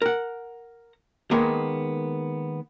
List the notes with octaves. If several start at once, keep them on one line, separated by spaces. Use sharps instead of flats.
A#4 F#5
D#3 G#3 A#3 B3